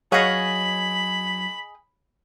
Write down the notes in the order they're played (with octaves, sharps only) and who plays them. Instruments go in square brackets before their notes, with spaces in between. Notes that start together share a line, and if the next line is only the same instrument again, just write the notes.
[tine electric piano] F#3 G#6 [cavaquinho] G#4 D#5 [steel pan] C#5 F5 F#5 [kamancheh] B5